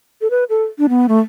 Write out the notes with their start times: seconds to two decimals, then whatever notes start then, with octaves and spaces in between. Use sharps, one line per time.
0.21 A4
0.30 B4
0.50 A4
0.79 D4
0.89 B3
1.09 A3